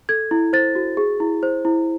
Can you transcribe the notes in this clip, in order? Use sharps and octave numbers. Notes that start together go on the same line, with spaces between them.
A4 G#6
E4
C5 A6
F#4
G#4
E4
C5
E4